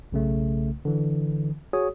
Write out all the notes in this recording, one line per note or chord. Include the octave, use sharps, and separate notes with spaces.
B1 C#3 A3
D3 E3
F#4 G#4 C#5 D#6